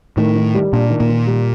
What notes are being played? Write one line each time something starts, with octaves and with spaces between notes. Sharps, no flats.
A2 D#3 A3
D#3
G3
A#2 A#3 D4
D#3
A#2 A#3
D#3
G3